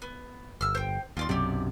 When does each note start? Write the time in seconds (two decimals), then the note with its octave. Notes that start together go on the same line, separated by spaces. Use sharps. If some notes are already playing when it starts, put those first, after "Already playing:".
0.02 B3
0.61 G1 E6 F6
0.75 C5 G5
1.17 D#2 F4 D5 C6
1.29 B1 F#2 C3 G4 D5